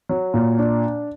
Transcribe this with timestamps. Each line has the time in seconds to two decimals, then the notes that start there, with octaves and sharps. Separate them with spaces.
0.09 F#3
0.34 A#2
0.59 D4